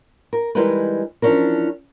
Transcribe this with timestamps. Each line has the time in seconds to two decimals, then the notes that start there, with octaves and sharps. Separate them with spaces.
0.33 A#4
0.55 E3 G3 G#3 D#4 A#4 B4
1.22 E3 F3 C#4 D4 A#4